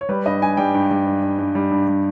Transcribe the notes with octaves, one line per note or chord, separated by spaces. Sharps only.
C#5
G3 B4
G2 D#5
G2 G#5
G3 G5
G2
G3
G2
G2
G2
G3
G2
G3